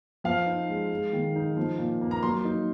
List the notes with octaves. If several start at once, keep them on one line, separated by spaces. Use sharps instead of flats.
F3 F5
D#4
G#3
G#3
D#3
D#4
F3
A#2
A#3
A#5
F#3 C6
D#4